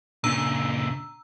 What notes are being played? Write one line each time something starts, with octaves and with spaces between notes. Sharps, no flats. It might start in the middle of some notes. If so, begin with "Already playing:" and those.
A#2 C#3 D4 A#5 E6